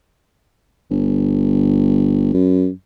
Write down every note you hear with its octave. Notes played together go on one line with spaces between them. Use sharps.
G1
F#2